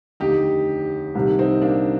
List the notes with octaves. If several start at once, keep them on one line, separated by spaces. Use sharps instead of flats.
F1 D#2 D3 D#4 G4
C2 C3 D#3
C4 D#4
A#3 D4